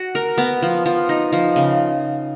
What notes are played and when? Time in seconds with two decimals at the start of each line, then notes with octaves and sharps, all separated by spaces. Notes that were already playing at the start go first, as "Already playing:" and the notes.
Already playing: F#4
0.15 A#4
0.38 B3
0.62 F3
0.86 F3
1.09 D#4
1.33 F3
1.56 C#3